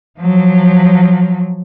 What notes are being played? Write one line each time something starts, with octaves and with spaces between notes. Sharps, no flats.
F3 F#3